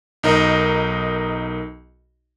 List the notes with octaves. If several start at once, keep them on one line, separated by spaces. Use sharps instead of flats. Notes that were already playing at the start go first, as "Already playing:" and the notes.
B1 D#4 A#4 D#5